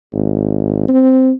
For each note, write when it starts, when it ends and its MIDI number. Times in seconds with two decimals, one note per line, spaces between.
0.14 0.86 32
0.89 1.32 60